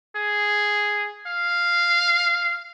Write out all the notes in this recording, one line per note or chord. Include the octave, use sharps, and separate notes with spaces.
G#4
F5